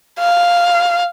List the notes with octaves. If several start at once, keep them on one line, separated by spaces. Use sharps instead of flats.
F5